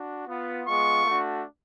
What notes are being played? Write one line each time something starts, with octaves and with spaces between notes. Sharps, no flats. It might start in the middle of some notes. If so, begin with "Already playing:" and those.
Already playing: D4 F#4
B3 F4
G#3 B3 F4 C#6
A3 D4 F#4